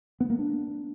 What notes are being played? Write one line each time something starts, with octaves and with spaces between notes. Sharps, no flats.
B3
A#3
D4